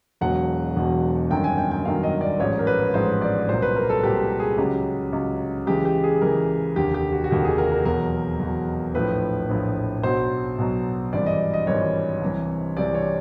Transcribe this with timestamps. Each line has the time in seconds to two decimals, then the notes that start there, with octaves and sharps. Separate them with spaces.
0.21 E1 E2 B2 F#3 F#5
0.76 E1 E2 B2 F#3
1.30 G1 F#2 D#3 F#3 G5
1.44 G#5
1.58 G5
1.71 G5
1.85 G1 F#2 D#3 F#3 F5
2.03 D#5
2.21 D5
2.40 A1 G#2 F3 C#5
2.59 A#4
2.67 B4
2.94 A1 G#2 F3 C5
3.21 D5
3.48 C2 A#2 F#3 C5
3.62 B4
3.76 A#4
3.90 A4
4.03 C2 A#2 F#3 G4
4.40 G#4
4.58 C#2 C#3 F#3 G4
5.12 C#2 C#3 F#3
5.67 C#2 C#3 E3 G4
5.85 G4
6.04 G#4
6.21 C#2 C#3 E3 A#4
6.76 F1 D#2 D3 G4
6.94 G4
7.13 F#4
7.24 F#4
7.31 F1 D#2 D3 G4
7.45 G#4
7.58 A#4
7.72 A#4
7.85 E2 B2 F#3 A#4
8.39 E2 B2 F#3
8.94 A#1 A2 F3 B4
9.49 A#1 A2 F3
10.03 B1 B2 F#3 C5
10.58 B1 B2 F#3
11.13 G#1 G2 E3 D5
11.26 D#5
11.54 D#5
11.67 G#1 G2 E3 C#5
12.22 C2 C3 E3
12.77 C2 C3 E3 D5
12.94 C#5